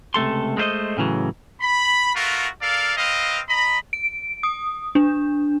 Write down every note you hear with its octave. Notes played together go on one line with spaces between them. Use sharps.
C#2 C3 A3 A4 C6
G#3 A3 B3 C5 D#5
A2 C#3 E3 F#3
B5
A3 B3 F4 F#4 A#4
A4 A#4 D5 F5
C4 B4 D#5 F5
D#5 A#5 B5
D7
D#6
D4